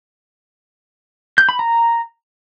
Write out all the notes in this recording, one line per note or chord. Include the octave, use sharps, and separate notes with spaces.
G6
B5
A#5